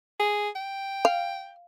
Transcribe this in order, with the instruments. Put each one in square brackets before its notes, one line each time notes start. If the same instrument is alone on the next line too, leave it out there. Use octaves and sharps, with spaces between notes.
[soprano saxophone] G#4
G5
[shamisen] F5